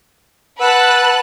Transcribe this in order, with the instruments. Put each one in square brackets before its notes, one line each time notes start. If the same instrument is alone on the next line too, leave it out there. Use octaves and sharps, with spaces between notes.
[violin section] B4 A5 F#6 [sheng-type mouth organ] F#5 E6